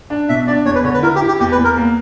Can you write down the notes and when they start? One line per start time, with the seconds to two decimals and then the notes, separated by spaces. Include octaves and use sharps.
0.10 D4
0.29 B2 E5
0.47 D4 D5
0.65 E2 C#5
0.75 B4
0.84 D3 C#5
0.94 B4
1.03 E4 A#4
1.15 G4
1.22 E4
1.28 G4
1.40 E2 G4
1.52 B4
1.58 E2
1.64 A#4
1.77 A#3